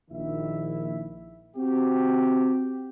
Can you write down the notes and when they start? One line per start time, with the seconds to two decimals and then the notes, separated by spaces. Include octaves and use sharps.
0.10 A#1 D#3 E4 E5
1.56 C4 F#4 G4